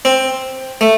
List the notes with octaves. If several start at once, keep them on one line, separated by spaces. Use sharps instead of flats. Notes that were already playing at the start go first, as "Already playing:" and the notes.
C4
A3